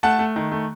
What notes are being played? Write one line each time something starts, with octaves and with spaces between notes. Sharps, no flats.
A3 F#5 A5
A3
D#3
A3